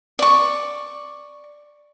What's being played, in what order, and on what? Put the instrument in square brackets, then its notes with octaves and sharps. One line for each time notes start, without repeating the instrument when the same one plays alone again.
[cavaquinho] D5 C#6